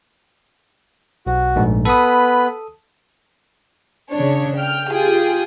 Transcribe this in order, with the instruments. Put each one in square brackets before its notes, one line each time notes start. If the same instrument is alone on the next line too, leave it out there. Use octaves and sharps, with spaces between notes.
[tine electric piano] B1 [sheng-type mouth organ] F#4
[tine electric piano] A#1 G#2 A3
[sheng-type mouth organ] B3 B5 [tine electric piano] A4 D#6
[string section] C#3 D4 C#5
G5 F6
F4 G4 G#4 G5 D#6